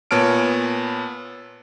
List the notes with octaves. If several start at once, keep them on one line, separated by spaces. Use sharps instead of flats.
A#2 B3 C#5 A5 F6 D7